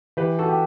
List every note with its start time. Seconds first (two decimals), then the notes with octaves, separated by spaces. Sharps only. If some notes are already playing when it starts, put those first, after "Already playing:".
0.17 E3 G4 B4
0.39 F#4 A4
0.49 G4